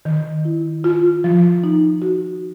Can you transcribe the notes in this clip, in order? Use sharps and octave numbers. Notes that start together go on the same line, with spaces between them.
D#3
E4
F4
F3
D#4
F#4